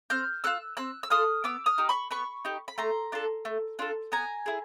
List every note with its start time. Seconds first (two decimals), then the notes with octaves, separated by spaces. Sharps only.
0.10 C4 F6 G6
0.44 F4 A4 E6 F#6
0.77 C4 E6 F#6
1.03 E6
1.10 F4 A4 D#6 F6
1.44 B3 D6 E6
1.66 D#6 F6
1.78 D#4 G4
1.89 B5 C#6
2.11 B3 B5 C#6
2.45 D#4 G4
2.68 B5
2.78 A3 A#5 C6
3.12 D4 F4 A4
3.45 A3
3.79 D4 F4 A4
4.12 B3 G#5 A#5
4.46 E4 G#4